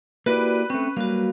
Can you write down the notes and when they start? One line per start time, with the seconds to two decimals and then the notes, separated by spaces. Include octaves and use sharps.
0.26 A#3 E4 F#4 G4 B4 D5
0.70 A3 C4 C#4
0.97 F#3 G3 A#3 F#4 F5